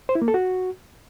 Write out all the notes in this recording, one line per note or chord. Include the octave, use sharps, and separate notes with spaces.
C5
E4
A#3
A4
F#4